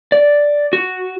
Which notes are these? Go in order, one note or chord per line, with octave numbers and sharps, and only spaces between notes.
D5
F#4